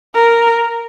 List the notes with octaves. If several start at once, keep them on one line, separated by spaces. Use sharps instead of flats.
A#4